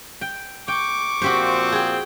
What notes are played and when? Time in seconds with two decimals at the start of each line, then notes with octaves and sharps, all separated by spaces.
0.21 G5
0.68 G5 C#6 D6
1.22 A#2 F3 C4 F#4 G4 C5
1.72 G#4 G5